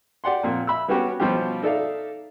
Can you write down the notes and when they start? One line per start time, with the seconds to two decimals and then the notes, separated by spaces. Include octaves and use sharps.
0.24 G4 D5 F#5 C6
0.43 F2 A#2
0.67 E5 B5 E6
0.88 G3 B3 C#4 F#4 G4
1.20 B2 F3 G3 C#4 F4 G4
1.62 D#4 A4 D5 E5 F5